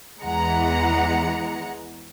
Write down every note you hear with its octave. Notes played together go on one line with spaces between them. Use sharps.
E2 E3 G#3 F#5 A#5 C#7